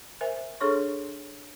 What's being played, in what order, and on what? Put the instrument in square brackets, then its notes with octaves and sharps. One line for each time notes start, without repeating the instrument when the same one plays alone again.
[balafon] A#4 C5 E5 G#5
D4 G#4 A4 C#5 C6 C#6